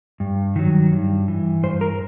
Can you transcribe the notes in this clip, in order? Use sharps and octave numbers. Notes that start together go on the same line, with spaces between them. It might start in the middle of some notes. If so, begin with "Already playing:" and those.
G2
D#3 F#3
G2
E3
G2 C5
A#4